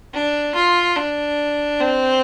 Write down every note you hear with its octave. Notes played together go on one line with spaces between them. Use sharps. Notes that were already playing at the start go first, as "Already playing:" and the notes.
D4
F4
D4
C4